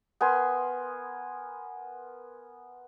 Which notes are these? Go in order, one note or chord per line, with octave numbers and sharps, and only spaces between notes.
B3 A#4 G#5 C6